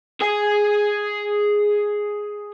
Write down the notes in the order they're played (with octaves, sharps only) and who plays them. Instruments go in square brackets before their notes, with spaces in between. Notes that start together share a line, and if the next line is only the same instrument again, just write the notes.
[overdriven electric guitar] G#4 G#5